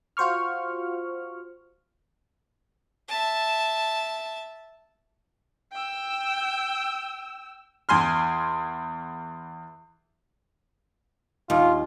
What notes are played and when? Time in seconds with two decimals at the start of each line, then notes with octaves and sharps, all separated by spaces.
0.17 F4 F#4 C5 C#6 F6
3.08 E5 A5
5.72 G5 E6
7.89 E2 G#5 C6 F6
11.50 D#2 F4